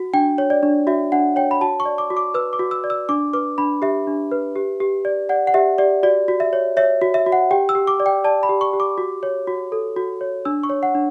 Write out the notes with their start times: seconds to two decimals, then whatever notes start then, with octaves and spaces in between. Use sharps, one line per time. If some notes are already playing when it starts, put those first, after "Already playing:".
Already playing: F#4
0.13 D4 G5
0.38 C#5
0.50 D5
0.63 D4
0.87 F#4 E5
1.12 D4 F#5
1.36 C#5 G5
1.51 B5
1.61 F#4 A5
1.80 C#6
1.85 D5
1.98 D6
2.10 F#4
2.17 D6
2.34 B4 E6
2.53 D6
2.59 F#4
2.71 E6
2.84 D5
2.90 E6
3.09 D4 D6
3.34 B4 D6
3.58 D4 B5
3.82 G4 E5
4.07 D4
4.31 B4
4.56 G4
4.80 G4
5.05 D5
5.29 D5 F#5
5.47 F#5
5.54 G4 E5
5.78 G4 D5
6.03 F#4 D5
6.28 F#4
6.40 E5
6.53 C#5
6.77 C#5 E5
7.02 F#4
7.14 E5
7.26 F#4
7.32 F#5
7.51 G4 G5
7.69 E6
7.75 G4
7.87 D6
8.00 D5
8.06 G5
8.24 D5 A5
8.43 B5
8.49 G4
8.61 C#6
8.73 G4
8.80 D6
8.98 F#4
9.23 C#5
9.47 F#4
9.72 A4
9.96 F#4
10.21 C#5
10.45 D4 E6
10.63 C#6
10.70 C#5
10.83 F#5
10.95 D4